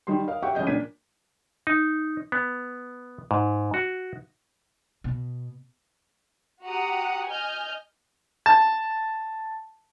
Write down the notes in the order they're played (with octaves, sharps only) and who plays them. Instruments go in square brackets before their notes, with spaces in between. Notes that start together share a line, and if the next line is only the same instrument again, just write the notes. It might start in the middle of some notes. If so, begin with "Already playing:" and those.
[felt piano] D#3 G3 C6
A#4 D#5 F5
G4 E5 F#5 G5 C#6
C#2 F3 C#4 D#5 G6
A#2 D4 A#4 G#6 B6 D#7
[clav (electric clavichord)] D#4
B3
G#2
F#4
[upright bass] B2
[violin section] F#4 G4 F#5 A#5 D#6
D#5 G#5 F6 G6
[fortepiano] A5